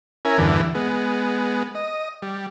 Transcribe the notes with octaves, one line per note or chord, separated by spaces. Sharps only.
C#4 E4 A#4 G#5
E2 G2 D3 E3
G#3 B3
D#5
G3